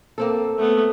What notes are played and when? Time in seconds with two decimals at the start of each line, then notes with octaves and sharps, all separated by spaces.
0.18 A#3 C4 A4
0.58 A3 B3